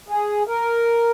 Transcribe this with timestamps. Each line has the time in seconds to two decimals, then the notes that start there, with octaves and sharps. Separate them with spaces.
0.08 G#4
0.47 A#4